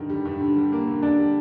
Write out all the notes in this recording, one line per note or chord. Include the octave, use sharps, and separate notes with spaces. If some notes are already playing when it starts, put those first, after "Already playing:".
Already playing: G2 D3 D#3
G3
G2
D3
G3
A#3
D3
D4
G3